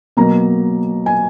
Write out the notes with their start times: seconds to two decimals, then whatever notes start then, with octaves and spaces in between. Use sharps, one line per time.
0.17 B2 F#3 A#3 A#5
1.06 G#5